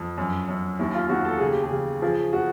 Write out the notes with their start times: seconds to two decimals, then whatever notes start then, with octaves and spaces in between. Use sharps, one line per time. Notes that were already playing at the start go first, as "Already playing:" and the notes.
Already playing: F2
0.18 F#2
0.48 F#2
0.79 D#2 E4
0.94 F4
1.09 D#2 F#4
1.25 A4
1.38 C#3 G#4
1.51 G4
1.64 G#4
1.72 C#3
2.02 F3 G#4
2.33 F#4